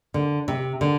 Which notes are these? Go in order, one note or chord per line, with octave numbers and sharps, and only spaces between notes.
D3
C3
D3